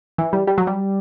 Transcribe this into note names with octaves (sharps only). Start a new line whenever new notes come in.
E3
G3
G3
F#3
G3